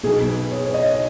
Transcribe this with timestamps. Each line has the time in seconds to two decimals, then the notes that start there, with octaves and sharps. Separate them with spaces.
0.04 B1 B2 G#4
0.28 B4
0.51 C#5
0.66 C#5
0.74 D#5